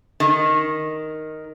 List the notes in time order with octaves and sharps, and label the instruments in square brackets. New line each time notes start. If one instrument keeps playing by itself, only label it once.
[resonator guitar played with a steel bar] D#3